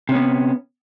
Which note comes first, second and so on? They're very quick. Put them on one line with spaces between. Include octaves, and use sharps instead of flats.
C3 C#4 B3